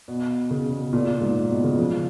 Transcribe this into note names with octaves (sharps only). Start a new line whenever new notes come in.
B2
C#3
B2
A#2
A#2
G#2
B2
C#3
F3